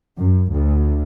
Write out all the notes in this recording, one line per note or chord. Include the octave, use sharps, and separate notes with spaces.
F#2
D2